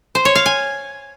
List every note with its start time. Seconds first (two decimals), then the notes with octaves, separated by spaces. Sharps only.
0.15 C5
0.25 C#5
0.35 F5
0.46 G#5